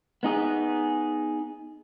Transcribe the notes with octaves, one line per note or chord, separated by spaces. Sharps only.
B3 D#4 G#4